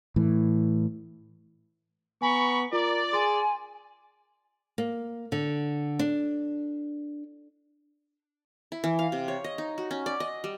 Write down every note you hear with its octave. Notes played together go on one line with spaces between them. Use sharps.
A2 E3
B3 G#5 A#5 B5 C#6
F4 A#4 D5
G#4 G#5 C6
A#3
D3
D4
E4
E3
F5
C3
C#5
D#5
D#4
F#4
C#4
D5
D#5
G3